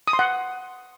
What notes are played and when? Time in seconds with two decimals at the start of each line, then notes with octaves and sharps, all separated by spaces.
0.08 D#6
0.13 C6
0.19 F#5